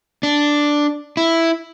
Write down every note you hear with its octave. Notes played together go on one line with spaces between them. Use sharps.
D4
E4